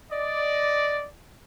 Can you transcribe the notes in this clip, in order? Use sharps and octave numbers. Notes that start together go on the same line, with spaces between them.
D5 D#5